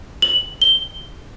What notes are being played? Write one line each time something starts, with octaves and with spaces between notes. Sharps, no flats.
F#7
G7